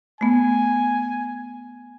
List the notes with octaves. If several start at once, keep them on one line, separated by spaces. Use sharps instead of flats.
A3 B3 G#5